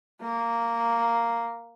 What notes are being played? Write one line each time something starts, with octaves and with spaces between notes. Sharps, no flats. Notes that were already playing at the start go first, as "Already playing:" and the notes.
A#3